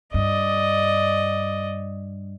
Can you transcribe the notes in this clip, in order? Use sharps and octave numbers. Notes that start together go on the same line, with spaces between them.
G2 D5 D#5